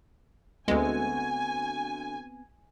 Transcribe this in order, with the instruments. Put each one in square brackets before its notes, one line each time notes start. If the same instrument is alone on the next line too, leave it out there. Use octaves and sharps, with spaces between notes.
[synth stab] D2 G#3 [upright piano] D3 A3 F#4 [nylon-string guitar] B3 C4 [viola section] G#5